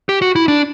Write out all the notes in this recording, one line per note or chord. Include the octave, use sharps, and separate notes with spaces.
G4
F#4
E4
D4